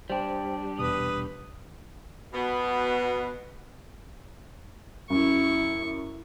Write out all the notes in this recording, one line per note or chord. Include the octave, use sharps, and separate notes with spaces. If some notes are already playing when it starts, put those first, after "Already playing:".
G3 D4 C5 G5
E2 B2 B4 D#6
B2 B3
F#2 E4 C#6